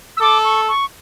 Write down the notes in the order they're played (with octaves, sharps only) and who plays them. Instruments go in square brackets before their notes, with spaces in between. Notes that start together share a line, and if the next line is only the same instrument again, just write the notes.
[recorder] E6
[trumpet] A4 [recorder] D6
[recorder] C#6
C#6